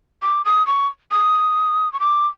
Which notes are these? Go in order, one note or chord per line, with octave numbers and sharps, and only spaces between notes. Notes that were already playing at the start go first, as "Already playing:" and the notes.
D6
D#6
C#6
D#6
C#6
D6